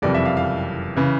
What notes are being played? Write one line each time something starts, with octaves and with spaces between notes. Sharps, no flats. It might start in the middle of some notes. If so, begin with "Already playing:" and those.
F#1 F2 C3 E3 G3 D5
E5
F5
F5
C#3 E3